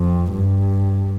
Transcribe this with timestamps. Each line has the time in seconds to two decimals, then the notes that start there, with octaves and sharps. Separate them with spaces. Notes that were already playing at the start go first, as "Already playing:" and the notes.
Already playing: F2
0.31 G2